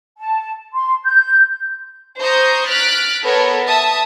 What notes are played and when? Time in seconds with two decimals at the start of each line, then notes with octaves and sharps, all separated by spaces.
0.18 A5
0.73 C6
1.03 G6
2.21 C5 A#5 C#6 D#6 G6
2.69 F6 F#6 A6 B6 D7
3.24 B3 A4 A#4 C#5
3.67 E5 A5 D#6